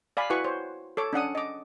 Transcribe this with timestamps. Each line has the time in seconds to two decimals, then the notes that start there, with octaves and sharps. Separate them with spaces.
0.17 D5 F5 G#5 B5
0.30 E4 F#4 B4 F#5 G#5 C#6
0.44 C5 C#5
0.97 A4 C#5 D6
1.13 C#4 D4 F#5 D#6
1.35 D#5 D6